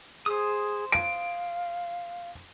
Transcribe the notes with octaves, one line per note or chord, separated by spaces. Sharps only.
G#4 C5 D#6
F5 D7